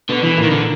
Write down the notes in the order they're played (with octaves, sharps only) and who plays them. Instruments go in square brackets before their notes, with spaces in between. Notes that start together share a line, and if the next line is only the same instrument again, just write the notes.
[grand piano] B2 B3 [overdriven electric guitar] D3
[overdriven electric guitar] E3
[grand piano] A#2 A#3
[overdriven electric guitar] D#3
D3